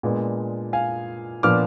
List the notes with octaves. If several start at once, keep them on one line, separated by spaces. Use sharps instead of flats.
A#2 G#3 B3 D4
F5 G#5
A#2 F3 B3 D4 D6 F6